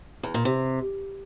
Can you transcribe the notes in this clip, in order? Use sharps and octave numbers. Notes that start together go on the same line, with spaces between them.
E2
A#2
C3